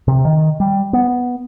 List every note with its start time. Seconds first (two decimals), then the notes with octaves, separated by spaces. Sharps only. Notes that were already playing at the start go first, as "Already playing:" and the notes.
0.08 C3
0.25 D#3
0.60 G3
0.93 B3